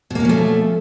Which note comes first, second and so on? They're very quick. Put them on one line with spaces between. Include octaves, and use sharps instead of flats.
B2 A#3 C#4 F3 A3